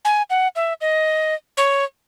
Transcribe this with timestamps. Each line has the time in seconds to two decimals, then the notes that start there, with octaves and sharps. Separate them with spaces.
0.05 G#5
0.30 F#5
0.56 E5
0.81 D#5
1.57 C#5